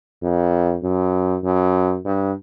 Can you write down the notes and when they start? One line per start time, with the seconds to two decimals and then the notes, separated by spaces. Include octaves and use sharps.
0.23 F2
0.83 F#2
1.44 F#2
2.05 G2